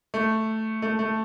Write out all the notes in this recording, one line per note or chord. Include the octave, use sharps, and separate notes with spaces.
A3
A3
A3